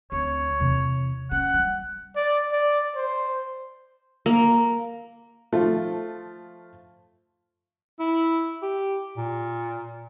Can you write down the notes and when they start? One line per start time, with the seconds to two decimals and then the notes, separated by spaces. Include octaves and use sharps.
0.12 D2 C4 C#5
0.60 E2 C3
1.31 C#4 F#5
1.54 G3
2.16 D5
2.52 D5
2.96 C5
4.26 A#3
5.52 F3 A3 F4
8.00 E4
8.62 G4
9.17 A#2